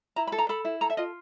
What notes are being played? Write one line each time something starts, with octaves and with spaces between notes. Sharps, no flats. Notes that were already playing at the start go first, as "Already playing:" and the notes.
E4 A#5
B5
A4
A#5
A4 B5
E4
A4 A#5
E5
F4 D#5